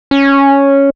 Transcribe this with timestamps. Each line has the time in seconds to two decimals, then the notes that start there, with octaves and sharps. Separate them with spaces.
0.11 C#4